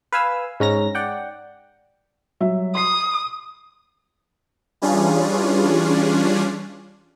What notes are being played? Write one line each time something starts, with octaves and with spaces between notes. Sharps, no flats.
B4 F5 G#5 E6
G#2 C#4 A#5 A#6
D5 F#5 G5
F#3 G3 E5
C6 D#6 C7
E3 G3 C#4 D4 F4 G#4